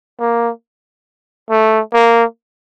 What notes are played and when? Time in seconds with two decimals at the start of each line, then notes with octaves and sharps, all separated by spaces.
0.20 A#3
1.50 A3
1.93 A#3